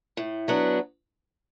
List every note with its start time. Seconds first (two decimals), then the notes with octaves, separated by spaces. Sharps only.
0.17 A2
0.48 F#3 B3 D4